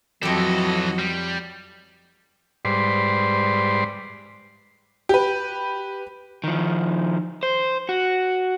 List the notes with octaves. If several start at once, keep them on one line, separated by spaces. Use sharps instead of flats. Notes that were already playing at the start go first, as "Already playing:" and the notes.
F2 E3 F#3 F#4 G4 A4 D#5
G3
G#2 G3 B4 C5 D5 C6
G4 B4
D#3 F3
C5
F#4